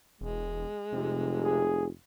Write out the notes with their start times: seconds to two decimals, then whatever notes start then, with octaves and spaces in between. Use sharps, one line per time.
0.21 E1 G#3
0.92 F1 C3
1.43 G#4